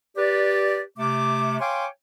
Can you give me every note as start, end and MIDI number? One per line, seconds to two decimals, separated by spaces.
0.17 0.81 67
0.17 0.81 71
0.17 0.81 74
0.98 1.59 48
0.98 1.59 57
0.98 1.59 86
1.61 1.86 73
1.61 1.86 77
1.61 1.86 79
1.61 1.86 80
1.61 1.86 84
1.61 1.86 86